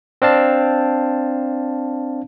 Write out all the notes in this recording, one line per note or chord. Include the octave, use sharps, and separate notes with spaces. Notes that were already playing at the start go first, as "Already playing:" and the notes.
C4 D4 F5 A5